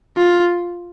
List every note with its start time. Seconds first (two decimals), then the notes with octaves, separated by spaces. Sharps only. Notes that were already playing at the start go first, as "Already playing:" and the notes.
0.17 F4